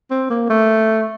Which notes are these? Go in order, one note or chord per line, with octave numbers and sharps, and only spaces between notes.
C4
A#3
A3